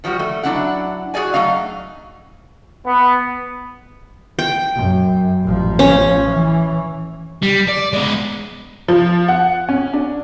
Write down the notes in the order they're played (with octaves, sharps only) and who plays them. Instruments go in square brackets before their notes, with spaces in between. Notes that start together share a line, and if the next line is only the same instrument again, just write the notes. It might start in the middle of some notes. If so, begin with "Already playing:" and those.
[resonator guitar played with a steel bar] D#3 F3 G3 F#4
A3
F#3 A#3 D4 E4 D5 F#5
F#4 G#4 A4 D5 G#5
F#3 A3 D#4 F5
[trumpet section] B3
[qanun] G5
[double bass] F#2
A1 F3
[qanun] C#4
[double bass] E3
[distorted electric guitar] G3
D5
G#3 B3
[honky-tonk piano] F3
F#5
C#4
D4